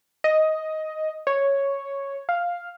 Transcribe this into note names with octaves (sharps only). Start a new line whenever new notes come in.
D#5
C#5
F5